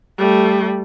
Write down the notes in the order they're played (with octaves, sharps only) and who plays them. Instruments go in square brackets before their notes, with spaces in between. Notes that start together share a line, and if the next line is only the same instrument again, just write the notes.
[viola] G3 A3